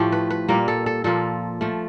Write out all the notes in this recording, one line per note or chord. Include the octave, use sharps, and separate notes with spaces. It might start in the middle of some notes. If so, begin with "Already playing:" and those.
Already playing: A2 F3 A3 G4
B4
B4
A#2 G3 A#3 A#4
A4
A4
A#2 F3 A#3 A4
F3 A3